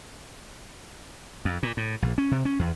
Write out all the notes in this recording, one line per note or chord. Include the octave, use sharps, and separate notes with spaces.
F2
A#2
A2
A#1
C#4
C3
C#4
E2